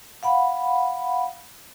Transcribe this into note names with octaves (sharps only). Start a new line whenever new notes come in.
F5 F#5 B5